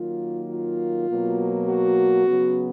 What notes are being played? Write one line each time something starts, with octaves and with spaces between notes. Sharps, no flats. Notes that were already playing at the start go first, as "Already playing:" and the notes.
Already playing: D#3 F#3 A#3 F4
F4
B2 F#3 A#3
F#4
C#3 F#3 B3